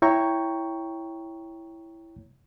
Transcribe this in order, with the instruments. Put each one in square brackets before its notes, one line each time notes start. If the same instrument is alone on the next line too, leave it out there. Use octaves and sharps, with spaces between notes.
[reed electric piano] E4 C#5 G5 A#5 C#6